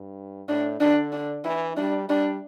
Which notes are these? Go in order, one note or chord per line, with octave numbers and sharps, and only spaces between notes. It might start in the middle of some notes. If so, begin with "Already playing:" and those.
Already playing: G2
A2 D4
D3 D4
D4
E3 E4
G3 D4
G3 D4